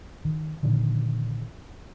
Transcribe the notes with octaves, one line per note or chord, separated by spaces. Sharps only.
D#3
A#2 D3 D#3 F3